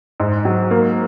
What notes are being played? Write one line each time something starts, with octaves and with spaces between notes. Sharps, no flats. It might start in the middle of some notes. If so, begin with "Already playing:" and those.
G#2
F#3
A#3